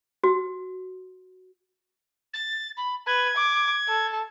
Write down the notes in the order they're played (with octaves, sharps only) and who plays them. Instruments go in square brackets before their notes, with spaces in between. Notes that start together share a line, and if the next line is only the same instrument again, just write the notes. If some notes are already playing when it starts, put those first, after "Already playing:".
[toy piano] F#4
[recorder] A6
B5
[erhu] B4 [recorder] G#6
[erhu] D6
A4